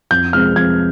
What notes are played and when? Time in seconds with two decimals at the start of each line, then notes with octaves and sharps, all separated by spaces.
0.11 F2 G6
0.33 C3 F3 G#3 C4 F6
0.56 F2 G#6